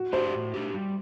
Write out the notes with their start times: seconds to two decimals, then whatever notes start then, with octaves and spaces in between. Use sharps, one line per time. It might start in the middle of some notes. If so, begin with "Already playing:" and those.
Already playing: F#4
0.13 A3 D4 G4 C5
0.34 A2
0.54 A3 D4 G4
0.74 G3